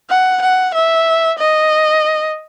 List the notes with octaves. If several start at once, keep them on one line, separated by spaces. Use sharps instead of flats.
F#5
F#5
E5
D#5